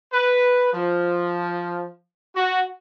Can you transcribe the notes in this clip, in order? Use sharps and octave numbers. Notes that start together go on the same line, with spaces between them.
B4
F3
F#4